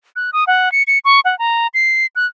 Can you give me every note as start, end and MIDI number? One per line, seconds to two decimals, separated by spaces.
0.16 0.31 90
0.33 0.44 87
0.47 0.72 78
0.72 0.83 97
0.87 0.99 97
1.05 1.20 85
1.25 1.37 78
1.39 1.67 82
1.74 2.06 96
2.16 2.26 90